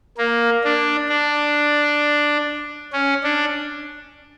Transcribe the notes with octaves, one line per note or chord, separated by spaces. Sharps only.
A#3
D4
D4
C#4
D4